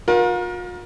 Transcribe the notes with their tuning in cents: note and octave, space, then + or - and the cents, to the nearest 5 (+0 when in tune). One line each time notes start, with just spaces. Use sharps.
F4 +45 A#4 +30